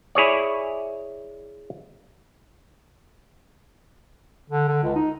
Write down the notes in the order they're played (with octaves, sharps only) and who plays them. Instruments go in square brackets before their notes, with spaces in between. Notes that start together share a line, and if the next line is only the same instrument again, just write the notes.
[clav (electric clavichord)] E4 G#4 C#5 D5
[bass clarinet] D3
D3
C#2
D#4